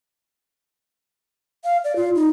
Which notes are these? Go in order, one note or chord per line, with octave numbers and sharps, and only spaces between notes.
F5
D5
F4
D#4